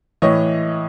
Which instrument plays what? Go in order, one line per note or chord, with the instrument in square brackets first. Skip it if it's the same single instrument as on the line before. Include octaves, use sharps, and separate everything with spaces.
[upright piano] A2 E3 C#5 D#5